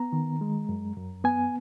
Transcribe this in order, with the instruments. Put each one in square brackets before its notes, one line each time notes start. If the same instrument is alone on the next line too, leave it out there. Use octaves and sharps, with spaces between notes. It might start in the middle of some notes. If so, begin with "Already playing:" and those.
Already playing: [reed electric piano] B3 A#5
D#3
G#3
F#2
F#2
B3 G#5